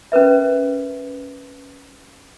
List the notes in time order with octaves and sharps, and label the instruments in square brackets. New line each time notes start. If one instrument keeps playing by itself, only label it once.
[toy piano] C#4 A#4 B4 E5